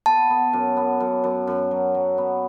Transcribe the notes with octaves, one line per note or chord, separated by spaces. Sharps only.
B3 A5
B3
F#2
B3
F#2
F#2
F#2
F#3
F#3
B3